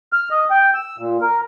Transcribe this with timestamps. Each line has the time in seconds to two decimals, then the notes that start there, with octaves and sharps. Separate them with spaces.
0.13 F6
0.31 D#5
0.51 G5
0.74 E6
0.98 A#2
1.21 A#4